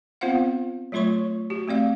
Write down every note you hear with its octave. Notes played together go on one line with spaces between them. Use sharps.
B3 C4 F4 C5 F5 F#5
F#3 A3 F4 C#5 C6 C#6
F#4 G4
A3 C4 D5 F5